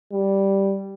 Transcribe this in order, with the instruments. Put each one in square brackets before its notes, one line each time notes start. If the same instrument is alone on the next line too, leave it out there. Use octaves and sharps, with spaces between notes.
[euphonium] G3